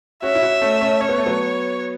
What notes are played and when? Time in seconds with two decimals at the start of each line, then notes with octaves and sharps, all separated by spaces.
0.22 C#4 F#4 E5
0.35 E4
0.42 C#4 F#4
0.61 A3 C#4
0.81 A3 C#4
1.00 C#4 C#5
1.09 B3
1.18 A3
1.26 F#3 B3